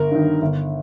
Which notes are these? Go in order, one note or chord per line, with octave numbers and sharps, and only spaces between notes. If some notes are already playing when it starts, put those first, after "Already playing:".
Already playing: G1 A#4
G2 D#3
G1